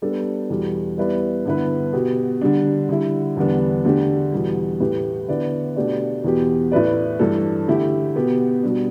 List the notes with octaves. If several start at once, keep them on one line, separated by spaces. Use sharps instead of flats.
G3 B3 D4 A4
E2 B2 G3
G3 B3 E4 B4 D5
G2 D3 B3 E4 B4
B2 B3 G4
D3 G3 D4
D3 G3 E4
E2 D3 G3 B3 D4
D3 A3 D4 G4
E2 B2 G3
A2 A3 G4 B4
D3 B3 E4 B4 D5
B2 A3 D4 G4 D5
E2 B2 B3 G4
A2 A3 E4 B4 D5
G2 E3 A3 D4 A4
D3 A3 E4 G4
B2 B3 G4
B2 G3 D4